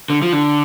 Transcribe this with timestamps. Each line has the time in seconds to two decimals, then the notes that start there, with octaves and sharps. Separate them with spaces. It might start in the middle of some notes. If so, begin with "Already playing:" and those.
0.10 D3
0.22 F3
0.33 D3